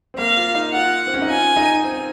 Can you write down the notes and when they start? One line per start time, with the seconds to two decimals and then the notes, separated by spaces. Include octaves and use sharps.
0.14 C4
0.18 A#3 F5
0.37 F4
0.55 D#4
0.73 F4 F#5
1.07 C4
1.14 C#4
1.22 D#4
1.29 F4 G#5
1.56 D#4
1.84 C4